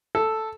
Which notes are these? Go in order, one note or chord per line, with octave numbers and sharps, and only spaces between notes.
A4